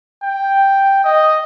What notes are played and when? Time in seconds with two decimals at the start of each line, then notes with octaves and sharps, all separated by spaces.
0.23 G5
1.04 D#5